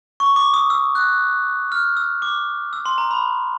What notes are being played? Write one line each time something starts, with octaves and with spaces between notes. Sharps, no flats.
C#6
D6
D#6
E6
F#6
F6
E6
D6
E6
C6
A#5
B5